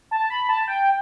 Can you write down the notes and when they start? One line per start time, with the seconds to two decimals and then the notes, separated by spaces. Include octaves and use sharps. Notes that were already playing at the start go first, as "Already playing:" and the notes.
0.11 A5
0.30 B5
0.49 A5
0.68 G5